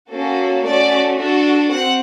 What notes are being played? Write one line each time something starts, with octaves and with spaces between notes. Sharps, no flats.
A#3 C#4 F#4 A4
A3 C#4 F#4 D5
D4 F#4 A4
C4 F#5